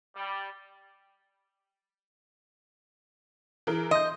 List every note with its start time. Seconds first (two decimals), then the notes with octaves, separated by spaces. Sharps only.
0.15 G3
3.67 E3 G#4 A#4
3.91 D#5 C6 G6